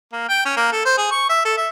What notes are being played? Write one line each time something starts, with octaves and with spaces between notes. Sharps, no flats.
A#3
G5
C#4
A#3
A4
C5
G#4
C#6
E5
A4
E5